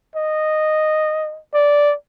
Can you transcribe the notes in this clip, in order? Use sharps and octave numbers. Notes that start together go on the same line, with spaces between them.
D#5
D5